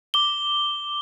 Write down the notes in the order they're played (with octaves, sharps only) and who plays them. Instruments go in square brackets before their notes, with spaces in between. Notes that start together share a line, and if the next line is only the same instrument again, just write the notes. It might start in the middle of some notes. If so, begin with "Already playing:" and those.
[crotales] D6 G7